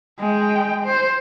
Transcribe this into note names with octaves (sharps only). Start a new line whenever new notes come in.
G#3 G5
C5